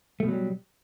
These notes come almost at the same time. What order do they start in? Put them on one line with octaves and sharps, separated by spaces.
A3 B2 F#3 G3